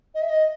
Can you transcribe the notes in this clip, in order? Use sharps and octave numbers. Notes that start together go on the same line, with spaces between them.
D#5
E5
D#5